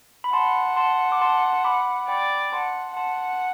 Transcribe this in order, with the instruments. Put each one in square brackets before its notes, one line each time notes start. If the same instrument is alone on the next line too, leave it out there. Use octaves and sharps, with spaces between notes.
[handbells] B5
[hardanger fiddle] F#5 [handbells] A5 C6
[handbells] A5 C6
D6
A5 C6
B5 D6
[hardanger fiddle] D5 [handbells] G5 B5
[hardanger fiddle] F#5 [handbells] A5 C6
[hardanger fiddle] F#5 [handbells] A5 C6